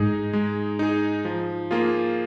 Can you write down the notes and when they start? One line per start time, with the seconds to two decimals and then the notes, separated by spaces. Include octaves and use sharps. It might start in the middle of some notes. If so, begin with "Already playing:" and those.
Already playing: G#2 G#3 D#4 G#4
0.33 G#3
0.79 D#4 G#4
1.25 F3
1.71 A#3 F4 G#4